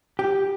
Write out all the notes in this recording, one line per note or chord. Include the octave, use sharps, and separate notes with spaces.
G4